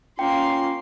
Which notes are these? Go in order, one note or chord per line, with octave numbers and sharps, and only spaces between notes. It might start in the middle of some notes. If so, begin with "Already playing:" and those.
A#3 C#4 F4 G5 C6